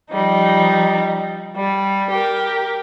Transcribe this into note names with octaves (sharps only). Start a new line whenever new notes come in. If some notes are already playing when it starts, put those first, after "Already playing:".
F3 G3 D#4
G3
G4 A#4